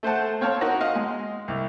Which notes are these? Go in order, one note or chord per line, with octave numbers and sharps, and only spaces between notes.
A3 C5 F#5 A5
C4 C#5 F5 A5
D#4 F#4 A#4
D#5 F5 C6
G#3
C2